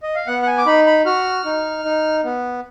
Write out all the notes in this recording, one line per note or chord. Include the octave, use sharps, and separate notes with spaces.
D#5
F5
B3 F#5
F#5
G#5
D6
D#4 B5
B5
F#4 F6
D#4
D#4
B3